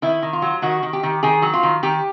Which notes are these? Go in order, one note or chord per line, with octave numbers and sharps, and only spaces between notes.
D#3 E4
D#3
F4
F#3
D#3 F#4
D#3
G4
D#3
D#3 G#4
F#3
F4
D#3
D#3 G4